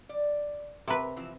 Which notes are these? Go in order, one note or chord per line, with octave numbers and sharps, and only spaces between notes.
D5
C3 A#4 B4
E3 F3 C4